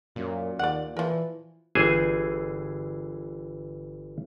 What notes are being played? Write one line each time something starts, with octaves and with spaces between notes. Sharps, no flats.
F#2 A#2
D#2 D5 F#5
E3 F3 A#4
G1 E3 G#4 C5 G#5